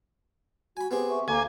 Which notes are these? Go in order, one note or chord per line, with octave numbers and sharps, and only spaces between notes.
F#4 G#5 B5
B3 C4 G4 G#4
E5 C#6
D2 A#3 F5 G#5 A#5 D6